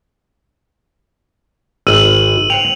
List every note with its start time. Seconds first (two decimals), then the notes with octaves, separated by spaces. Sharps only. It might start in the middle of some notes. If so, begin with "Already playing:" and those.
1.87 G#1 E6 D#7 F#7
2.50 C5 F#5 G5 F7